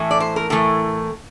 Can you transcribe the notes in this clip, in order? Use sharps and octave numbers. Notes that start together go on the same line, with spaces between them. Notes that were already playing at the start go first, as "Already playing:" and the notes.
Already playing: A2 E3 A3
D5
C5
A#4
A2 E3 A3 A#4